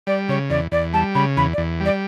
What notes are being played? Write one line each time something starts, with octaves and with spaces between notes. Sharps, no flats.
G3 D5
C#3 C#5
E2 D5
E2 D5
G3 A5
C#3 B5
E2 B5
D5
E2
G3
D5